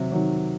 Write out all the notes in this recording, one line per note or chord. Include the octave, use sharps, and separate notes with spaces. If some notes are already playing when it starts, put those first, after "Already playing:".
Already playing: C3 D#3 F#3
D#3 F#3